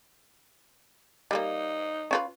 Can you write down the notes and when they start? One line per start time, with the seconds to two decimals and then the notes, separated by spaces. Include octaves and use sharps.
1.31 G3 G#3 A#3 D#4
2.11 C#4 F4 B4